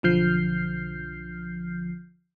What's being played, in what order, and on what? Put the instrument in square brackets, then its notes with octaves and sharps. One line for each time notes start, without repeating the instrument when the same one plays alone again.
[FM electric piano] B1 D3 F3 F6 G6 C7